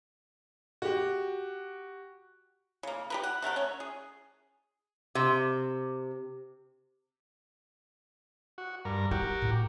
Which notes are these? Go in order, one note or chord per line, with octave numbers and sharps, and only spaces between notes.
F#4 G4
C#3 A#3
G4 A#4 B4
F#5
C3 A3 A#4 F#5
C#4 C#5
G#4
C3
F#4
G2 A#4
E4 F#4 G4 A#4
A2